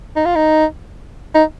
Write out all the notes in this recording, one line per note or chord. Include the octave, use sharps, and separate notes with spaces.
D#4
F4
D#4
D#4